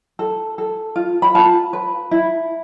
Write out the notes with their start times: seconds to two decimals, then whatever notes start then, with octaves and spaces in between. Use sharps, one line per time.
0.19 A4
0.58 A4
0.96 F4
1.22 B5
1.35 F4 A5
1.73 B4
2.11 E4